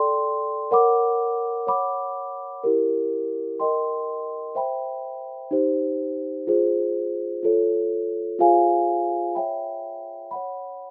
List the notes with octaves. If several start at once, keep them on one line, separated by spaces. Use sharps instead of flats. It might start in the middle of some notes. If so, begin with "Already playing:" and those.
Already playing: A4 D5 G5 C6
A#4 C#5 F#5 B5 D6
C#5 F#5 B5 D6
E4 G4 A#4
A#4 D#5 G5 C6
C5 E5 G5 B5
D#4 G4 C5
F4 G#4 C5
F4 A4 C#5
F4 G#4 C5 F5 G#5
C#5 E5 G5 B5
C#5 F#5 B5